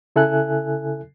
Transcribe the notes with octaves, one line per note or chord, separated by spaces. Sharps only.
C#3 E4 A4 E5 G#5 F#6